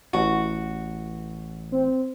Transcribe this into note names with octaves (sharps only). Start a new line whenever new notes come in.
A1 F#4
C4